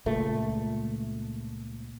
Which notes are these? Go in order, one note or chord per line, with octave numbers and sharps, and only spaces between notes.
C#2 A#2 A3